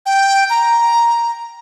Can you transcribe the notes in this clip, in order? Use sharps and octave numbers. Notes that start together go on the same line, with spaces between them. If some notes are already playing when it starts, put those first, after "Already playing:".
G5
A#5